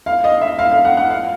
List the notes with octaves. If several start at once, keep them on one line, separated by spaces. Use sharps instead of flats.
F5
D#5
E5
F5
F5
F#5
F#5
F5